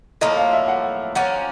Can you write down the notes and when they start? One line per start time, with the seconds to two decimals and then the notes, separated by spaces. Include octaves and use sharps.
0.21 A2 F3 A#3 D#5
0.37 F5
0.53 E5
0.68 F#5
1.15 F3 A#3 C#4 F#5